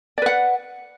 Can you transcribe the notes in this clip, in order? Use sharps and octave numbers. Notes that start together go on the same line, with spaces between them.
B4 D5 F#5